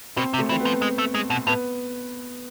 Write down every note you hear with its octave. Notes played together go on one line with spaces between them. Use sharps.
B2 C4
C3
A3
E3 C4
B3
F3
G#3
A3
G#3
B2
A2 B3